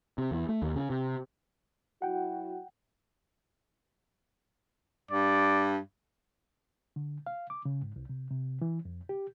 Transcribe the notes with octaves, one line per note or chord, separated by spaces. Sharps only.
C3
E2
A3
D#2
C#3
C3
F#3 E4 F#4 F#5 G5
G2 D5
D3
F5
D6
C#3
G#2
C2
C3
C3
E3
F2
G4